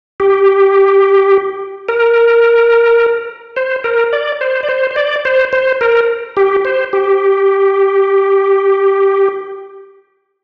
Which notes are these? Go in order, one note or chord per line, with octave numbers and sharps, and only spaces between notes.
G4
A#4
C5
A#4
D5
C5
D5
C5
C5
D5
C5
C5
A#4
G4
C5
G4